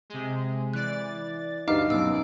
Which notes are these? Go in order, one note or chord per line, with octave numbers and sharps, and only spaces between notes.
C3 G#3
E3 D5 F#6 A6
D2 G2 D#4 B4 F5 D6 F6
F#2 B2 D6 E6